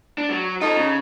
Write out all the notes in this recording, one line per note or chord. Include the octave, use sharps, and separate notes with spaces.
D4
F#3
D#4 F4 A4
C#3